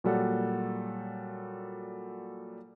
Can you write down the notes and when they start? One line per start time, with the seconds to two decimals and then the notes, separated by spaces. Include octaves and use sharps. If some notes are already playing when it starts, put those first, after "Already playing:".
0.04 A#2 F#3 G3 A4 F#5